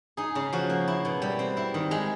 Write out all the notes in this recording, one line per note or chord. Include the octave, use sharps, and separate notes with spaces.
D#4 G#4
C#3
F3 F#4
A#3
E4
B2
G3
C4
E4
D#3
G#3